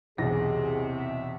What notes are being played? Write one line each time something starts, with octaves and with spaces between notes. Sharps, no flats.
B1 E2 C3 G#4 A#6
E5